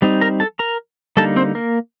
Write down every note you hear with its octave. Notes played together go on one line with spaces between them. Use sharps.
G3 C4 D#4
A#4 A#5
A4 A5
A#4 A#5
D3 G3 A#3 D#4 A4 A5
C4 C5
A#3 A#4